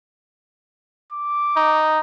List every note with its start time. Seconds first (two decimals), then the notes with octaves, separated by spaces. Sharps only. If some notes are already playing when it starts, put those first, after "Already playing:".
1.12 D6
1.56 D#4